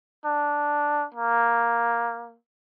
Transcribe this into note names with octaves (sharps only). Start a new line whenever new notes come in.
D4
A#3